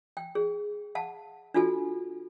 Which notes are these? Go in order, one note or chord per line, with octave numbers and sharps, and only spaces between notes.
G5
G#4
F5 F#5 A5
D4 F4 F#4 A4 G#5